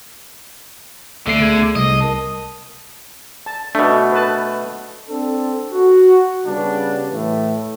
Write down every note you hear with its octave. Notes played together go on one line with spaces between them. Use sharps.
C#2 D3 A3 C7
B3 G#4 G#6
C2 D#5
A#4 A5 D#6
A5
B2 A3 D4
B4 A5
C4 D4 A4
F#4
C#3 G3 B3 D4
A2 E3 A3